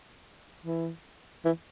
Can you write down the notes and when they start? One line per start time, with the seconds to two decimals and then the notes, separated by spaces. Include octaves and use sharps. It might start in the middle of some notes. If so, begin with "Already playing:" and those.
0.66 E3
1.45 E3